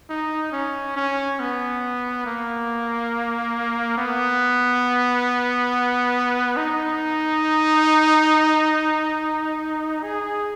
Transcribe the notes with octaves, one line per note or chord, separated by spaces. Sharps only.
D#4
C#4
C#4
B3
A#3
B3
D#4
G#4